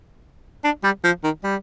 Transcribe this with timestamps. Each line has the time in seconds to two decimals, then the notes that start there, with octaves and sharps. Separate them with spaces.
0.64 D4
0.84 G3
1.04 F3
1.24 D#3
1.43 G3